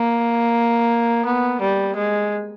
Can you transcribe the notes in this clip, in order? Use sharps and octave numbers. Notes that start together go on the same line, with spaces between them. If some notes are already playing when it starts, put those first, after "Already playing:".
Already playing: A#3
B3
G3
G#3